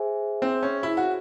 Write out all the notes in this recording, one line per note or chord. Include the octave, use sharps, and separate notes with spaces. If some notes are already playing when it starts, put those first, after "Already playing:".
Already playing: G#4 C5 E5 G#5
C4
C#4
E4
F#4